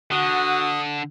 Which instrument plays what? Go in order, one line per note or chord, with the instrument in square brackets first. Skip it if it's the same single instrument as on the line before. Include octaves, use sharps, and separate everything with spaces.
[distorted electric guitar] D3 [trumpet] F#4 [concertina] D#6